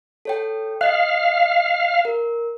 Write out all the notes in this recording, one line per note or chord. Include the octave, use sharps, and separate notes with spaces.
A4 C#5 G5
D#5 F5 F#6
A#4